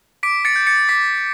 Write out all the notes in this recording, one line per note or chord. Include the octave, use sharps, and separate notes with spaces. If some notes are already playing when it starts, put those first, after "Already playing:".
D6 B6 D7
A6 C#7
G6
A6 C#7
D6 B6